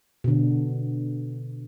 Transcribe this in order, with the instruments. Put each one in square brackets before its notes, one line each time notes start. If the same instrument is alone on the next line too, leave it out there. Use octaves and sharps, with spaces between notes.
[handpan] B2 D3